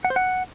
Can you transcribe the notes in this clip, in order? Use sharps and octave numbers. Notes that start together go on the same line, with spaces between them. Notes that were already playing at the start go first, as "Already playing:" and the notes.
F#5
C5
F#5